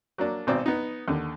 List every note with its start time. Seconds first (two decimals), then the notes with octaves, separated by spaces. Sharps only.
0.18 F#3 A#3 D4
0.47 G#1 B2 C4 D5 A#5
0.66 B3 D#4
1.08 D#2 D3